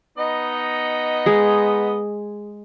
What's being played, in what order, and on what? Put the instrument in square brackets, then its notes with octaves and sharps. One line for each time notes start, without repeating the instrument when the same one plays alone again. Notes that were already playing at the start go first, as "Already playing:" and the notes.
[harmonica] B3 D#4 D#5
[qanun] G#3 G#4